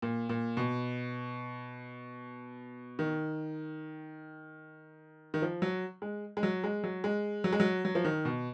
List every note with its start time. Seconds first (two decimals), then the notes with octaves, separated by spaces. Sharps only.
0.02 A#2
0.29 A#2
0.57 B2
2.99 D#3
5.34 D#3
5.42 F3
5.62 F#3
6.02 G#3
6.37 G#3
6.43 F#3
6.64 G#3
6.84 F#3
7.04 G#3
7.44 F#3
7.53 G#3
7.60 F#3
7.85 F#3
7.95 F3
8.05 D#3
8.25 B2